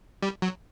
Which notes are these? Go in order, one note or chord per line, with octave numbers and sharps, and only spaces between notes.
G3
F#3